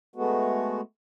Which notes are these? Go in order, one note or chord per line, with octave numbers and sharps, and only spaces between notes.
G#3 A3 B3 F#4